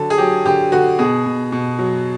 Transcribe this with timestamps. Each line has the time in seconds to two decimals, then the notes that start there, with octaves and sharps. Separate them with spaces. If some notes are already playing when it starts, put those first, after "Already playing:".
Already playing: D3 F#3 A4
0.10 G#4
0.18 F#3 G4
0.45 D3 G4
0.72 D3 F#4
0.99 B2 G#4
1.26 B2
1.52 B2
1.79 F#3